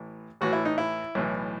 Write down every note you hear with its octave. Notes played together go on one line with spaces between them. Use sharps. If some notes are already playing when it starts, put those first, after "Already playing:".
Already playing: A1 A2 E3
A1 A2 E3 F#4
E4
D#4
E4
B1 A2 E3